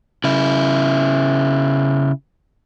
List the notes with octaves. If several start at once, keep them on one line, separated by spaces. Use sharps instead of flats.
C#3 E4